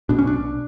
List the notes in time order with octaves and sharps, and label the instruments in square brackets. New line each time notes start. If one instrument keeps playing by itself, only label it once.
[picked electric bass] B1 B2 D4
C#4
D4